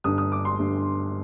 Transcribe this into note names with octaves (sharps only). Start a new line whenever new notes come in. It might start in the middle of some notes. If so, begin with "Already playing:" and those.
G1 G2 D3 D#6
D#6
D6
C6
G1 G2 D3